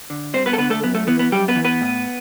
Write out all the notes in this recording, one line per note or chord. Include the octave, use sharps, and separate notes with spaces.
D3
G2 C4 C5
B3 B4
A4
D3 B3 B4
A3 A4
F#2 B3
A3
E3 B3
B3
F#2 G3 G4
B3 B4
E3
B3 B4
A2